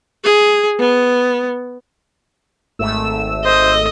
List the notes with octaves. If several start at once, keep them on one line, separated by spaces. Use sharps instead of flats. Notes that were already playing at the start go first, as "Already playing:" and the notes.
G#4
B3
G#1 A3 E6
C5 D#5